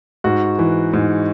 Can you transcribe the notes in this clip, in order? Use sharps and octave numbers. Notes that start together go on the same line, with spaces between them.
G#2 F#4
E3
G#2